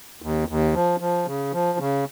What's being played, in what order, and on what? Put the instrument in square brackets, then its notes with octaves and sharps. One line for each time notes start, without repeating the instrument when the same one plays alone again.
[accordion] D#2
D#2
F3
F3
C#3
F3
C#3